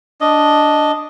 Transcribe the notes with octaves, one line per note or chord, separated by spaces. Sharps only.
D4 D#5